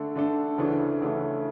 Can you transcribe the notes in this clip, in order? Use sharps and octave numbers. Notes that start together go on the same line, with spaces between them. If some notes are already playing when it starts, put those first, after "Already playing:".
Already playing: D3 A3 D4 A4
D3 A3 D4 A4
D2 C#3 E3 A3 D4
D2 C#3 E3 A3 D4